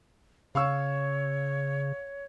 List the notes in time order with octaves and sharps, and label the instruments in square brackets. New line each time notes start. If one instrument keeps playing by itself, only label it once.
[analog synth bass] C#3 [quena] C#5 [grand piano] F5 C#6 E6